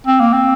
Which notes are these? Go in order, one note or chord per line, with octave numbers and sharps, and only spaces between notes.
C4
A#3
C4